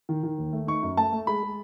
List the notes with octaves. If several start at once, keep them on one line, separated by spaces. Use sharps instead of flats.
D#3
D#3
D#2
A3
D#4 C#6
F#2
A3 A5
A3
G#3 B5
G#3